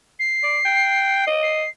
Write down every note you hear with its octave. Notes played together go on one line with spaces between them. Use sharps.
C7
D5
G5
D#5
C7